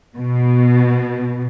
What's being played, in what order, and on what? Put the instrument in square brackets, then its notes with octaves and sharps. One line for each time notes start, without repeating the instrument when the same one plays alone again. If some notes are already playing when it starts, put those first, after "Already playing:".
[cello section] B2